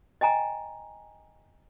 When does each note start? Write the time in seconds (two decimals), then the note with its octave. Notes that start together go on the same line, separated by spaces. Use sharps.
0.21 D#5 G5 G#5 A#5